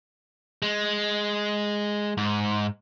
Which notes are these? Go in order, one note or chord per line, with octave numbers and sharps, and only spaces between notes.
G#3
G#2